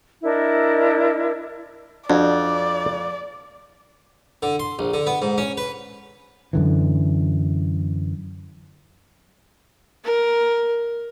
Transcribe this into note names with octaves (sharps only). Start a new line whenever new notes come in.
D4 E4 A#4 D#5
F2 D4 F#4 D5
D3
C6
A#1
D3
B3
G#2
C#4
B4
F#2 D3 E3
A#4